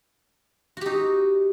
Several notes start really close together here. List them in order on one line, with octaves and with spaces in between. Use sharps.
F#4 G4 D#4